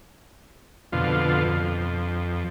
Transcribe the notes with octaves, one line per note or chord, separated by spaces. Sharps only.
F2 B2 D3 F4
F2